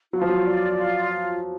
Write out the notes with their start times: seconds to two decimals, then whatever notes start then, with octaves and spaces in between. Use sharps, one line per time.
0.13 F#3 F4
0.21 F3
0.30 F#3
0.45 D5
0.77 F4